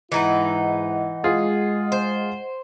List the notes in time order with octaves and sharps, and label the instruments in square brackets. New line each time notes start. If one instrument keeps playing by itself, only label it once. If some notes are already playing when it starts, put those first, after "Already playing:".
[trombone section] G#2 E4 [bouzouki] E3 D#4 B4 [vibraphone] D#5 F#5
[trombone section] G#3 [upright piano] F4 G#4
[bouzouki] C5